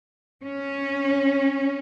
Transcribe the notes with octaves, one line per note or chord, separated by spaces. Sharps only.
C#4